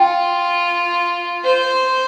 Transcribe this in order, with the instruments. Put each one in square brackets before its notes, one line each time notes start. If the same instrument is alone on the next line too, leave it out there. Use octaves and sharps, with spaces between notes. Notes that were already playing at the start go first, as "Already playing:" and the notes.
Already playing: [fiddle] F4 [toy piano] G5
[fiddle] C5